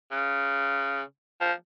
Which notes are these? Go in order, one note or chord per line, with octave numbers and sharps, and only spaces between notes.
C#3
F3